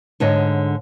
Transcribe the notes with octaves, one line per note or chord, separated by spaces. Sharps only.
G#2 D3 C#5 D#5